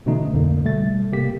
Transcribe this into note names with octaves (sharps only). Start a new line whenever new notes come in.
B2 D3 E3 A3 C#4 D#4
B1 F2 D3 A#3
B2 G3 A3 A6
C3 A#3 G4 B6